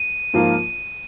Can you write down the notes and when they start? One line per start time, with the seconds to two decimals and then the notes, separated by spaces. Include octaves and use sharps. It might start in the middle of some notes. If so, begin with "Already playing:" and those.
Already playing: D#7
0.33 G#2 F3 A#3 F4